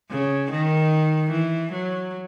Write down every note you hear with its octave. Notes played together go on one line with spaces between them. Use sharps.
C#3
D#3
E3
F#3